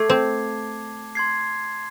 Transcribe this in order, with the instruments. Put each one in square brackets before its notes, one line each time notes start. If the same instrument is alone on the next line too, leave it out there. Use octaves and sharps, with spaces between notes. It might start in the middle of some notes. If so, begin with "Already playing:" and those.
Already playing: [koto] A3 [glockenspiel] A5 D6 G#6 C7
[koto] C4
[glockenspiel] C6 G#6 C7